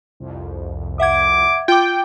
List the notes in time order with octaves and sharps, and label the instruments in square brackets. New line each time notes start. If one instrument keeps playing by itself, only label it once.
[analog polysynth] C2 F2
[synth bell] E5 F#5 G#6 [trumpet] D6
[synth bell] F4 D6 [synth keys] G5